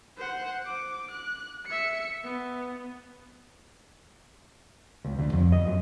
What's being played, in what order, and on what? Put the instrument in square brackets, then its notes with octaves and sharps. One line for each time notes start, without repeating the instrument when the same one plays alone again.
[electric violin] C5 F#5
D6
F#6
E5 C#7
B3
[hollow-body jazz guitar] C#2
D2
F2
D#5
F#2